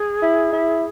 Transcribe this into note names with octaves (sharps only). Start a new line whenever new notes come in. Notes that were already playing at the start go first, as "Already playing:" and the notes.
Already playing: G#4
E4
E4